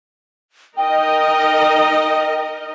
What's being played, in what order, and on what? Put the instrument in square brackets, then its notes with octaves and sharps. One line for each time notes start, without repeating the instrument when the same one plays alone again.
[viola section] D#4 A#4 D#5 [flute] G5